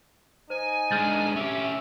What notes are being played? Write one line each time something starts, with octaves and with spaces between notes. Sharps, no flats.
D#4 C5 G#5
G#3 D4 F6 G6 A6
C#4 G4 E5